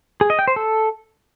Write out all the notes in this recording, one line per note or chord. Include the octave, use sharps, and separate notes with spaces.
G#4
D#5
G5
C5
A4